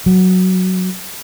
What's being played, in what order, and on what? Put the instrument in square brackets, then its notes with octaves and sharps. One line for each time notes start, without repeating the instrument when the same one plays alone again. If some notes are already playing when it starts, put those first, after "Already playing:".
[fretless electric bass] F#3